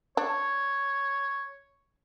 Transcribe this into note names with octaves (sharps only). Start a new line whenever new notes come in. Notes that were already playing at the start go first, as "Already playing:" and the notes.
D4 C#5